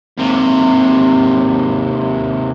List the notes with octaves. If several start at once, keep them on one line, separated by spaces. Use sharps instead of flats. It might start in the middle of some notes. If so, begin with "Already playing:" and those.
D#2 C3